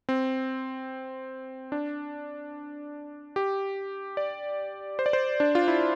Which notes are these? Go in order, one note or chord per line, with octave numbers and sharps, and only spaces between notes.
C4
D4
G4
D5
C5
D5
C5
D4
F4
E4